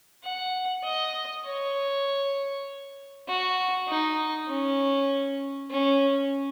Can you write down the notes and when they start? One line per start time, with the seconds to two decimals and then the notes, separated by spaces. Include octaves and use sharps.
0.24 F#5
0.84 D#5
1.45 C#5
3.27 F#4
3.88 D#4
4.48 C#4
5.70 C#4